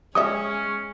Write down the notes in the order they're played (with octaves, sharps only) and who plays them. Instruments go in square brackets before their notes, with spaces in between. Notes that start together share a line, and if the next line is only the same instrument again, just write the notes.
[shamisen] G3 D#5 E5 [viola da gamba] G#3 [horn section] C#4 [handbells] D#6